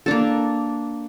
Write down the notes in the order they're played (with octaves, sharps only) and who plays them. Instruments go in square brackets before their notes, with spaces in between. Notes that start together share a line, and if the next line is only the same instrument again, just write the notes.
[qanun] A#3 D4 A4